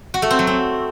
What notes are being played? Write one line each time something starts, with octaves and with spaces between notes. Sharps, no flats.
F#4
A3
C4
F#3
C4